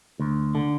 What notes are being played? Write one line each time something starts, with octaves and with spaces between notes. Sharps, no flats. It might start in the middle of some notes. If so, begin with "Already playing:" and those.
D2
D3